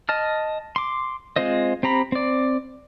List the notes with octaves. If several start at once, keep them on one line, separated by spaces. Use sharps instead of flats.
D#5 A5 F6
C6 D6
G#3 C4 F4 C5 D#5
C4 G4 A#5 B5
C4 D5